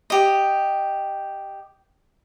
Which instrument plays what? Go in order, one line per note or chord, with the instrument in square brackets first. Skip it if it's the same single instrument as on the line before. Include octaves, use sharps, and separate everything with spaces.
[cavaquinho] G4 D#5